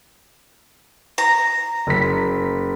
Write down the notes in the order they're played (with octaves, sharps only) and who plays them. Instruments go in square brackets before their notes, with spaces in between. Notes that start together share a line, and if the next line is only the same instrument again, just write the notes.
[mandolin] A#5
[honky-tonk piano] F#1 B6